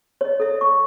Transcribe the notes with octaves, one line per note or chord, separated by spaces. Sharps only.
C#5 D#5
A4 E5
C#6